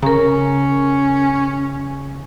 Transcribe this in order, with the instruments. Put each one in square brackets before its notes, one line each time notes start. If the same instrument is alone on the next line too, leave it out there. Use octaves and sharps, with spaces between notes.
[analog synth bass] C#3 [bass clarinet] C#4 [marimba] A#4 A#5